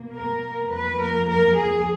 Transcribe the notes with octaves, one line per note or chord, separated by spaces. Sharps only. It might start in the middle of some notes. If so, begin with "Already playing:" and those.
Already playing: B2 A#3
A#4
F2 F3 A#3 B4
A#4
A#4
G#4